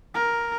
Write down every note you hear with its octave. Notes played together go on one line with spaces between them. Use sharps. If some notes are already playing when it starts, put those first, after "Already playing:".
A#4